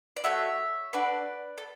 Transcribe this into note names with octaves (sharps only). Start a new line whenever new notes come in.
D5
A3 D4 F#4 C#5 E5
D4 F#4 A4 B4 D5
A4